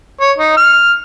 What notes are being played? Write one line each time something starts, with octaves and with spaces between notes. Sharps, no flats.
C#5
D#4
F6